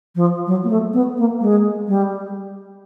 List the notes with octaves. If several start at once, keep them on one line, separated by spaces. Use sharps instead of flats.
F3
F#3
A#3
A3
B3
A#3
G#3
G3